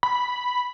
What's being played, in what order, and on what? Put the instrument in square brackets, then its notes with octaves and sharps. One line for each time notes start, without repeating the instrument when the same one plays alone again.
[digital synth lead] B5